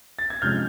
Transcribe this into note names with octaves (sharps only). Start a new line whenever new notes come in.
A6
G#6
C3 F3 G#3 C#4 F6 G6